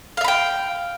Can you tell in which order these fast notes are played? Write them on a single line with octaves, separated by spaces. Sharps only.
F5 E5 B5 G5